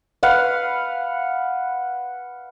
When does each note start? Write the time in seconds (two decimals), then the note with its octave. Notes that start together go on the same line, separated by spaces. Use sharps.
0.23 B4 F5 F#5